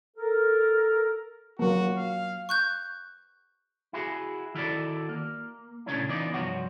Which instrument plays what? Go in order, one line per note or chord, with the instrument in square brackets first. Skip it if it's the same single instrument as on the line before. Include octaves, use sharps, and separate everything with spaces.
[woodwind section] A4 A#4
[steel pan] F#3 A#3 [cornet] F#4
[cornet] F5
[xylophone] C#6 F#6 G6
[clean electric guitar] E4 F#4 G#4
D#3 E4 F#4 A4 D5
A#3
A#2 C#3 A3 C#4 D4 E4
E3 B3 D#4 F4 D5
C2 G2 F3 F#4 C#5 F#5